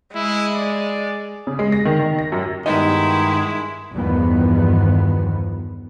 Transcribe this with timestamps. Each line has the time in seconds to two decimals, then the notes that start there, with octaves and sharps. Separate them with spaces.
0.15 G#3 E4
0.55 D5
1.47 C#3
1.59 G#3
1.72 A#6
1.85 D#3
1.99 D#3
2.19 A#6
2.32 F#2
2.66 G2 D#3 G#3 B3 E4 D#5
3.95 E2 G2 D#3 F3 B3